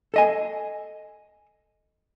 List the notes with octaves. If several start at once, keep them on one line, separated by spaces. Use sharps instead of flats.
A4 D#5 G#5